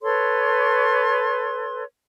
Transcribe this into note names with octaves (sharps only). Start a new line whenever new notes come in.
A4 B4 C#5 C6